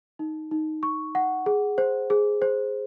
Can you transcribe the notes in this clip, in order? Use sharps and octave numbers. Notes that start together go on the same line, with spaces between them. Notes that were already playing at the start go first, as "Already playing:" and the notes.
D#4
D#4
C#6
F#5
G#4
C5
G#4
C5